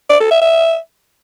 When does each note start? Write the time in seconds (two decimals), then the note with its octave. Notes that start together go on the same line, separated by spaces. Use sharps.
0.10 D5
0.20 A4
0.31 E5
0.42 E5